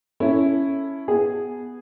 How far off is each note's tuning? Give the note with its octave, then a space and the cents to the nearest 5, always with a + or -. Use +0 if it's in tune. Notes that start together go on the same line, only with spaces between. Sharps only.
C#4 +0 E4 +0 A4 +0
B3 +0 G#4 -5